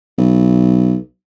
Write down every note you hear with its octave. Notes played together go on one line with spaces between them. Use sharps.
B1